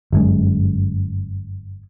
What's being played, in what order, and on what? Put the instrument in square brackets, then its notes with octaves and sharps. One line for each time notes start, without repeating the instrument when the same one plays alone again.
[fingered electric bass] G1 F#2 G#3